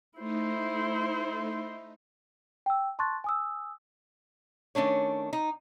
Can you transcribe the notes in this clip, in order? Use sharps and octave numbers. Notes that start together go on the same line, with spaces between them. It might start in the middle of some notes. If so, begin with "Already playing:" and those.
A3 D#4 E4 C5
G5 E6
A5 C6 C#6 F#6 A6
G#5 D#6 E6
D#3 A3 C#4 D4 C#5
D#4